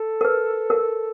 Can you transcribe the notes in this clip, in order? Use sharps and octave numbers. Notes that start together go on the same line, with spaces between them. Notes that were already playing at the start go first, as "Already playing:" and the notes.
Already playing: A4
A#4
B4
A#4